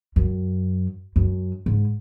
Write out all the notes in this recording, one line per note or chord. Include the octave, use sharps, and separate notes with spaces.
F#2
F#2
G#2